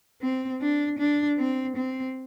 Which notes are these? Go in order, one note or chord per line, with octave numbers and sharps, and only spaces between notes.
C4
D4
D4
C4
C4